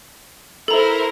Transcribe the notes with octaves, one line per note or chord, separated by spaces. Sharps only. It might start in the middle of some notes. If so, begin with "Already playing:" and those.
E4 A4 A#4 C5 A#5